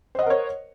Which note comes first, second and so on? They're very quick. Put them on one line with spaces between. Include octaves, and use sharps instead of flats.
C5 D#5 F#5 A#4 C#5